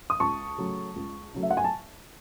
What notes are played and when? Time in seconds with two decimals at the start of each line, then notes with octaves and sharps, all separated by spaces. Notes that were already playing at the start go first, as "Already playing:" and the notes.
0.10 D#6
0.20 C#2 A5 C#6
0.58 C#3 F#3 A3
0.96 C#2
1.34 C#3 F#3 A3
1.43 E5
1.51 F#5
1.57 G#5
1.64 A5